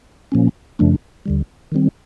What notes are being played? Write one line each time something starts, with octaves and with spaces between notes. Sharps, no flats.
A#2 F3 A#3 C#4
F#2 C#3 F3 A3 D4
D#2 D3 G3
D#3 G3 C4